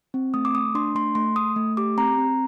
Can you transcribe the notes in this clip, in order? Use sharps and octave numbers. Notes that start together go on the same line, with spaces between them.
C4
A3 D#6
D6
A3 D#6
D4 C6
A3 C6
A3 C6
A3 D#6
A3
G4 D6
C4 A#5
C4